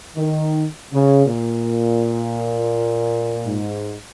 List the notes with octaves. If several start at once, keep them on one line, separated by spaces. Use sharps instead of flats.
D#3
C#3
A#2
G#2